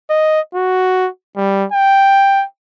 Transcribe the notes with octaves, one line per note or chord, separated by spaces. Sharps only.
D#5
F#4
G3
G5